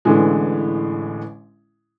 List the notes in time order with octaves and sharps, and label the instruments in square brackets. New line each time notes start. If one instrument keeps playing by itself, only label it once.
[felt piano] A1 A2 D3 E3 G#3